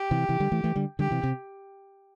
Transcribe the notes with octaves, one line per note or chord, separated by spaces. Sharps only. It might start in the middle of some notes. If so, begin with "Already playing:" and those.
Already playing: G4
C3 E3
C3 E3
D3 G3
E3 A3
E3 A3
D3 G3
D3 G3 G4
C3 E3
C3